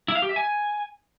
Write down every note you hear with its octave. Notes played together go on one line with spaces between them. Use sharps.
E4
F5
G4
E5
G#5